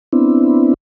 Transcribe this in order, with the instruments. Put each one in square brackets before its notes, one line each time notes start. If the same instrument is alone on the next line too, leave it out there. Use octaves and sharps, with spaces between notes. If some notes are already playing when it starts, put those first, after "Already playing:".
[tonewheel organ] B3 C4 D4 E4